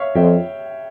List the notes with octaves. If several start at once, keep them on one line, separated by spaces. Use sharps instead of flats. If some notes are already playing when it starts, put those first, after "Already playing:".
Already playing: C#5 E5 F5
F2 E5 G5